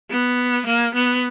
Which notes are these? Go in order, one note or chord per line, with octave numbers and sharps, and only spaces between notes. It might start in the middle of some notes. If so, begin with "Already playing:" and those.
B3
A#3
B3